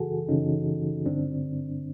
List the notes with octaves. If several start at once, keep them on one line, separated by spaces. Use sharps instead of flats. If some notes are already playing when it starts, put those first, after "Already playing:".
Already playing: F#2 C#3 E3 F#4 G#4 A4
F#2 C#3 E3 C#4 D#4
G2 D3 C4 D4